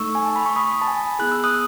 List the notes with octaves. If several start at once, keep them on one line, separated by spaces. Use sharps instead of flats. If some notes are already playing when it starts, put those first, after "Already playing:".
Already playing: A3 D#4 A4 C#6 E6
G#5
A5
B5
C#6
B5 D#6
A5
G#5 B5
B3 E4 G#4 F#6
E6
D#6 F#6